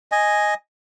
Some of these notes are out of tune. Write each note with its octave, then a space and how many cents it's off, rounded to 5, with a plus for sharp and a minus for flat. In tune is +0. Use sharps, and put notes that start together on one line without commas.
D#5 +0 G#5 +0